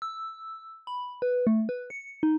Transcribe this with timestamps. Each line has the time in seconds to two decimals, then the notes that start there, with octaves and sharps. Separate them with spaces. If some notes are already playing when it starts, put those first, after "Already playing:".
0.02 E6
0.87 B5
1.22 B4
1.47 A3
1.69 B4
1.90 C#7
2.23 D#4